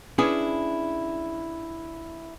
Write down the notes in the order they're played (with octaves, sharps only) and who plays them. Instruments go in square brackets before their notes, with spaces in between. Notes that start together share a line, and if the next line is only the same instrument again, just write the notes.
[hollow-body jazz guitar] C#4 D4 E4 G#4 B4